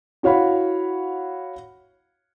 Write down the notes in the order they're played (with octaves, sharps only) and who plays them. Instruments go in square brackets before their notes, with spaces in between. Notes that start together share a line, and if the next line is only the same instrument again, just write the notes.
[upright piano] E4 F#4 C#5 F5 F#5 B5